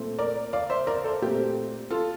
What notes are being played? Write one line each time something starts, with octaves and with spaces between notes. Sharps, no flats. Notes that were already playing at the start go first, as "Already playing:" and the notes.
Already playing: A#2 A3 C4
A#4 D5
D5 F5
C5 E5
A#4 D5
A4 C5
A#2 A3 C4 G4
F4 A4